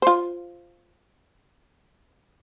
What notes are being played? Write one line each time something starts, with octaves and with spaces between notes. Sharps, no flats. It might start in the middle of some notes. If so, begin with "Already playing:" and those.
F4 C5